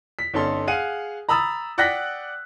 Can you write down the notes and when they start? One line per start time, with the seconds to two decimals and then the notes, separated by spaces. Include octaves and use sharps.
0.19 B6
0.34 G1 C#4 D#4 A4 C6
0.67 G#4 F5 F#5 D#7
1.29 A#5 B5 D#6 E6 A6
1.78 D5 F#5 G5 F#6 A#6 B6